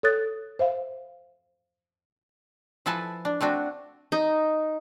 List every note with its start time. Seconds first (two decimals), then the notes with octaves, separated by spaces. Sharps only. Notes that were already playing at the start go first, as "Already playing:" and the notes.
0.03 A4 C#5 D#6 F#6 A6
0.59 C5 E5 F5
2.86 F3 E4 A4 B4 G#5 A5
3.25 D4
3.41 A3 C4 D4 F#4
4.12 D#4